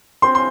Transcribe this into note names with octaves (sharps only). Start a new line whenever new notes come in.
C4 C6
C6